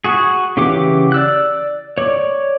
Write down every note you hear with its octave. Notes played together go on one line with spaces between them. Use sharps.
F#4 G#4
C#3 E3 G4 F#5 D6
D5 E6 F#6
C#5 D5